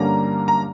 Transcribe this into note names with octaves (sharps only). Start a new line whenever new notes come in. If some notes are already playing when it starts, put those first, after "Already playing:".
Already playing: G2 D3 G3 A#3 C#4 A#5
A#5